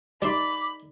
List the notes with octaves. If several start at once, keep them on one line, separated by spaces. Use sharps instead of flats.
G3 D#4 D5 E5 B5 C6 D6